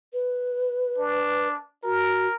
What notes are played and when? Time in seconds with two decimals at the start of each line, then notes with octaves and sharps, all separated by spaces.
0.13 B4
0.98 D4
1.83 F#4 A#4